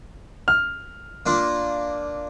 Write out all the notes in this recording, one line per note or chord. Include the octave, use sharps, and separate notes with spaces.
F6
A#3 D4 F4